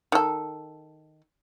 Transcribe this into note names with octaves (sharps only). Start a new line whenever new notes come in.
D#3 A4